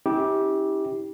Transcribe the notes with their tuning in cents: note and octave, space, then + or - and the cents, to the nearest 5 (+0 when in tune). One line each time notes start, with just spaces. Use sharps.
C#4 +0 E4 -40 G4 +0